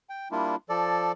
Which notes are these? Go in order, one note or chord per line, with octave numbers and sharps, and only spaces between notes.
G5
G3 A#3 D4 E4 F4
F3 A4 D5